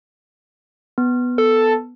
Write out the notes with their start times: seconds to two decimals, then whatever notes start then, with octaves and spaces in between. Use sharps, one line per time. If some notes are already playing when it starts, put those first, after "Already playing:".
0.98 B3
1.38 A4